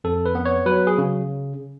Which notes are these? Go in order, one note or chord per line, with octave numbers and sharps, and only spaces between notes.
F2 A4
B4
B3
C#5
F#3 B4
G#4
C#3